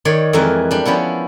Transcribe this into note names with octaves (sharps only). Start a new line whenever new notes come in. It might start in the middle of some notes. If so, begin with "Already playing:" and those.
D#3 C#5 D5
F2 E3 G#3 A#4 E5
G3 D4
F3 B3 C#4 E4